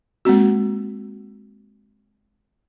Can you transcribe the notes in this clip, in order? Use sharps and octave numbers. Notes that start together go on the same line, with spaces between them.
G#3 A#3 C4 F#4